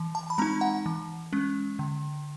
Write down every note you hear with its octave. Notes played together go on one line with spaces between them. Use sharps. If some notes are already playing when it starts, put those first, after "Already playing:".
Already playing: E3
A5
B5
G#3 C4 D#4 A#5
F#5
E3
G#3 C#4
D3